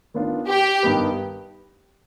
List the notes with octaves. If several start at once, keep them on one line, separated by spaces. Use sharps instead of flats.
D#3 B3 D4 F4
G4
G2 D#3 B3 D#4 B4